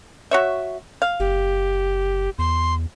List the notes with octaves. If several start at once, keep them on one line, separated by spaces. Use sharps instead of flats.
F#4 C#5 E5
F5
F#1 G4
E2 C6